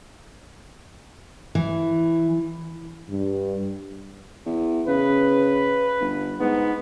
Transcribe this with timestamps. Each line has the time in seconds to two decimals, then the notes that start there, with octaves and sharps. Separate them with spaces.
1.55 E3
3.09 G2
4.46 E2
4.88 C#3 B4
6.01 G1
6.40 G#2 B3